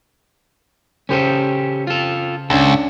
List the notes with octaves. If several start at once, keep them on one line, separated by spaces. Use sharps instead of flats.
C#3 C#4 G4 A4 C5 D#7
F4 A4
C#2 C#4 D4 A4